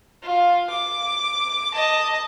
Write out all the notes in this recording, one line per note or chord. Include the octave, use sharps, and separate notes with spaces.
F4
D6
D#5 A5